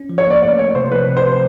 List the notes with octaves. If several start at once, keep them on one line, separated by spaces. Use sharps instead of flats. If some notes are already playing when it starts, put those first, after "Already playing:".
Already playing: C#4
F3
C#5
A#3 D5
A3 D5
A3 C#5
C3 C5
F3 B4
C3
C5
C3